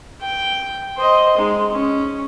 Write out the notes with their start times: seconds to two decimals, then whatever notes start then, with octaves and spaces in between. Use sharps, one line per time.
0.21 G5
0.97 C5 D#5
1.38 G#3 D#4
1.72 C#4